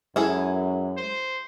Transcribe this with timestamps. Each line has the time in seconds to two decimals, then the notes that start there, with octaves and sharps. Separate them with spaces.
0.16 F#2 G#3 E4 G#4 A4
0.97 C5